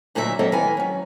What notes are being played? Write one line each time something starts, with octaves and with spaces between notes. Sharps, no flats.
D2 A#2 F#3 D#4 G#4 E5
F#3 A#3 C4 A4 D#5 E5
D#3 E3 B4 G#5
F#3 C#4